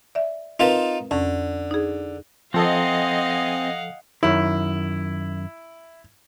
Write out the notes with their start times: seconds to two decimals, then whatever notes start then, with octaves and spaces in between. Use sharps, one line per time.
0.15 D5 E5
0.60 C4 D#4 F4 A#4 B4 A5
1.11 F2 D3 C#4
1.71 D#4 G#4
2.54 F3 C4 A4 D#5 F5 F#5 G#5
4.23 F#2 D#3 E4